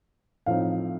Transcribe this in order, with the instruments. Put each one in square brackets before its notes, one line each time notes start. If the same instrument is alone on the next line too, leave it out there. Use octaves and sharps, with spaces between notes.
[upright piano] A2 F3 C4 D#4 F5